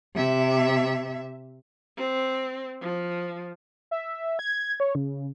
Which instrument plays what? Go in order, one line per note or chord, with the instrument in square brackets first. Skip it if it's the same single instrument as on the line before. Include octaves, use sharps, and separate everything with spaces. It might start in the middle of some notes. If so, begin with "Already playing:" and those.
[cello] C3 E5
[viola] C4
F3
[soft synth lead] E5
G#6
C#5
C#3